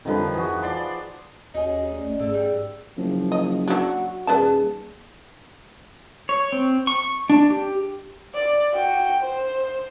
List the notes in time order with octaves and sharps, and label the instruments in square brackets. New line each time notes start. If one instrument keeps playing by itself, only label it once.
[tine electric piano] F2 D3 G3 [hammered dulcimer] D#3 F3 B4
[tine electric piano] F2 E3 [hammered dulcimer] F#4 G#4
[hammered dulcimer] F3 D5 C6 [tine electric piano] B5
[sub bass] D#2 [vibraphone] C#4 F#4 C#5 [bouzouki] D#4 G#4
[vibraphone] A3 C#4 D5
[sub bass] G#1
[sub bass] G#2 [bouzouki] D3 [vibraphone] G#4 D5 E6
[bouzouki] E3 G3
[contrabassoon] F#1 [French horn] F3
[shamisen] D#5
[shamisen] F#3 D4 [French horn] F#4
[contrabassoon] D#1 [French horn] G#4 [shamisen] B4 D5 A5
[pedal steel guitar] C#5
C4
C#6
D4
G4
[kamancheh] D5
F#4 G5
C5